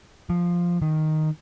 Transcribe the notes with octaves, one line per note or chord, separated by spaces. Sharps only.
F3
D#3